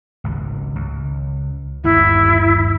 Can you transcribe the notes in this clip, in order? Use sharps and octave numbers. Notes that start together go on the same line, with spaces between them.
G#1 C#2
C#2
G1 D#2 G#2 E4